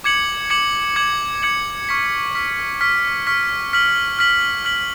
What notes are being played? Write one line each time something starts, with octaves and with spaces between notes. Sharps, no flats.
D6 G#6 C#7 F#7
D6 G#6 C#7 F#7
D6 G#6 C#7 F#7
D6 G#6 C#7 F#7
C#6 F6 B6
C#6 F6 B6
C#6 F6 B6
C#6 F6 B6
F6 B6 F#7
F6 B6 F#7
F6 B6 F#7